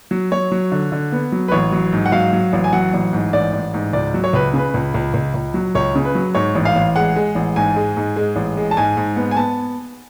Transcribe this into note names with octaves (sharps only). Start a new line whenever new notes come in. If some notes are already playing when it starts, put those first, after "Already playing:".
F#3
F#3 C#5
F#3
D3
D3
B3
F#3
B4
A1 C#5
F#3
G#2
F#5
F#3 F5
F#3
A1
G#5
F#3 F#5
A1
G#2
A1 D5
A1
G#2
C#2 D5
F#3
C#5
C#2 B4
C#3 B4
C#2
C#2
C#2
C#2
F#3
C#2 C#5
C#3
B4
F#3
G#2 C#5
A1
F5
A1
G#3 F#5
G#3
A1
G#2 G#5
G#3
G#2
G#3
A1
G#3
A5
G#2 G#5
G#2
B3
G#5
B3 A5